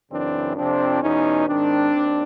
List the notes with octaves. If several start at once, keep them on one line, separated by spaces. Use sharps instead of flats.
F#2 C#3 E3 C4 D4
F2 C3 F3 C4 D4
E2 B2 C#4 D#4
G#2 D#3 C4 D4
D#2